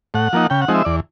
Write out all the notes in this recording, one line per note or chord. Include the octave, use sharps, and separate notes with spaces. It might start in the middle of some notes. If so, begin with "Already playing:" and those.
A2 F#5
F3 A#3 D#4
C#3 G5
F#5
F3 G#3 C4 D#4
E5
E2 D5